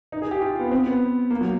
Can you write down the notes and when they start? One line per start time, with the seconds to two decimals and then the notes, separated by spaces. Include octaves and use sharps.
0.12 D#4
0.22 G#4
0.31 G4
0.41 F4
0.60 B3
0.71 C4
0.86 B3
1.30 A#3
1.41 F#3